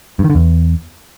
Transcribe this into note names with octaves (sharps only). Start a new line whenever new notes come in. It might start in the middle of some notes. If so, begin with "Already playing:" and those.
G2
D#3
D3
E2